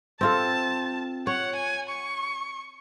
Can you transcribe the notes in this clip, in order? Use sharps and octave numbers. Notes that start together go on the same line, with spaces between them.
C4 F4 A4 A5
C#5 F#5
G#5
C#6